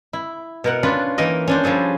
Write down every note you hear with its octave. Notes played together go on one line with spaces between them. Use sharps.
E4
B2 A#4 F#5
C#4 D4 F4 B4
E3 A#3 D#4 A#4 D#5
C#4 D4 C5
F3 G3 G#4 A4